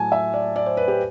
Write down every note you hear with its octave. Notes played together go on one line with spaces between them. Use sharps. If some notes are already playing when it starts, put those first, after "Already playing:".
Already playing: A2 F#3 A3 G#5 A5
E5
D5
D5
C5
B4
G4